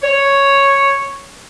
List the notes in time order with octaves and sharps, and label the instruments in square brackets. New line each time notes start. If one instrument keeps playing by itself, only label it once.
[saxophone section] C#5